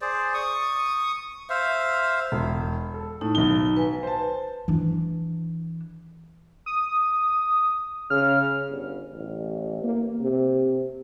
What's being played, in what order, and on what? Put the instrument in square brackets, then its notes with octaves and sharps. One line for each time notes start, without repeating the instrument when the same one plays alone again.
[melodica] G#4 C5 D5
C#6 D#6
C5 E5 F5
[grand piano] E1
A4
[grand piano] A2 [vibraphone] D#4
[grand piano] B1 D#3 G7
[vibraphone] B4 G#5
[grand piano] C5 A5
[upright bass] E3 D4
[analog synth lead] D#6
[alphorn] C#3 [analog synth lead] F6
[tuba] G1
A1
A#3
C3